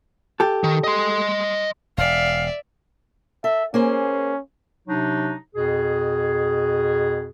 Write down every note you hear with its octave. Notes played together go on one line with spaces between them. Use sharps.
G4 A4
D#3
D#5 C6
E1 D5 E5 F5
A4 E5
A#3 C#4 G#4 C5
C3 F#3 D4 D#4
F2 B2 G#4